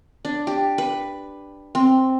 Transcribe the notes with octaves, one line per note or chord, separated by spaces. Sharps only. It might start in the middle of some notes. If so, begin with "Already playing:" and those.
D4
G4
B4
C4